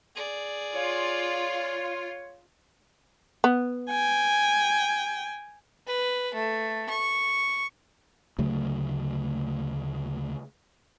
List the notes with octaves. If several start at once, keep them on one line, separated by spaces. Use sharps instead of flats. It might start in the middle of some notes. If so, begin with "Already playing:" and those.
G#4 D5
F4 C#5
B3
G5 G#5
B4
A3
C#6
D2 C#3 F#3 A3